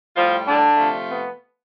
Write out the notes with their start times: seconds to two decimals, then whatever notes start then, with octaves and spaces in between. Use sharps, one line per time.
0.16 A2 F3 G3 F4
0.47 D3 D4
0.77 C3 F3 A3
1.08 B3